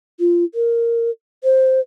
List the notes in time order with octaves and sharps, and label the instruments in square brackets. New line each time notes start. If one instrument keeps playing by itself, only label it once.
[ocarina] F4
A#4
C5